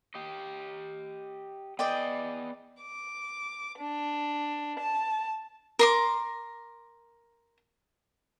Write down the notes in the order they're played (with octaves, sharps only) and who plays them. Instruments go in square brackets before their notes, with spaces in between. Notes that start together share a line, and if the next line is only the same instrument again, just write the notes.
[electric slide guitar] G4 D#5
[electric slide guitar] B3 G#4 [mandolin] D5 D#5 G5
[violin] D6
D4
A5
[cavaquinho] A#4 C6 D6